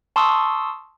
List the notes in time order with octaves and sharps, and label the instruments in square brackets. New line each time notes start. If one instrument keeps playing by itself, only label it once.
[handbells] A5 C6 C#6 D#6 E6